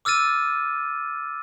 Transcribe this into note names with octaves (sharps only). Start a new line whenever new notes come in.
D6 E6 F6 A6 D#7